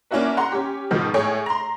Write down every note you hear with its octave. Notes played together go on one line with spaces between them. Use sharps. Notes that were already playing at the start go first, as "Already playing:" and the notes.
A#3 C#4 D4 E4 F#4 B4
F#5 A#5 C6
C#4 G4
G#2 B2 D#3 F3
A2 G#4 C#5 G5
A#5 C6